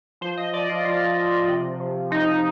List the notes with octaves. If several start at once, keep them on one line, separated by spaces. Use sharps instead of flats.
F3 C5
D#5
F3 D5
F4
F3 F4
F3
C3
F3
F3 D#4